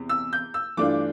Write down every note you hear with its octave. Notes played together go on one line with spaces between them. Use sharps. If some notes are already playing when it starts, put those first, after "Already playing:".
Already playing: E2 C3
E6
G6
E6
G2 E3 A3 D4 F4 D6